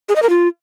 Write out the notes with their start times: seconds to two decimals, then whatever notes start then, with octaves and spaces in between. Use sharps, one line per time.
0.09 G#4
0.16 D#5
0.23 A#4
0.29 F4